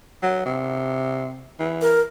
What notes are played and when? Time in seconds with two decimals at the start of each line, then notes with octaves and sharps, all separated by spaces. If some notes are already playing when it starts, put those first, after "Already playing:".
0.23 F#3
0.46 C3
1.59 E3
1.82 A#4